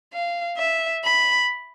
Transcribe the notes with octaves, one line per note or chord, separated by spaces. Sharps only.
F5
E5
B5